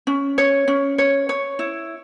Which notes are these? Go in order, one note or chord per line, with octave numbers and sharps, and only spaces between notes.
C#4
C#5
C#4
C#5
C#5
E4